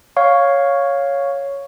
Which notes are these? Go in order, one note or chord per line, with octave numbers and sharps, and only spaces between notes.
C#5 F5 C#6